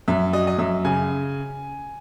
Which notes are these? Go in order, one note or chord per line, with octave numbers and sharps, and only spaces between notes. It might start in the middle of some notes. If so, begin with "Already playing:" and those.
F#2 E5
F#3 D#5
D#5
F#2 E5
C#3 G#5